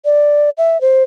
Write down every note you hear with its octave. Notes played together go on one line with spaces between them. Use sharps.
D5
E5
C5